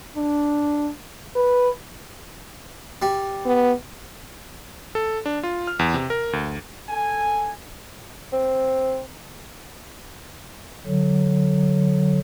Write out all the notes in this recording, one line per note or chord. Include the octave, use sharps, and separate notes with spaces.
D4
B4
G3
B3
A4
D4
F4
F6
E2
C3
A#4
D2
A4 G#5
C4
D3 F#3